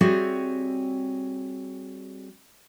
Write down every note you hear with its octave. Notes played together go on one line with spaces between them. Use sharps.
G3 C4 F#4 G#4 C#5 E5